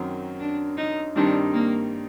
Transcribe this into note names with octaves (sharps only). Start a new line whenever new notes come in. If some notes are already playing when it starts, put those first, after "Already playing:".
Already playing: F#2 D#3 F#3 C4
D4
D#4
G2 D#3 G3 C4 D4 D#4
A#3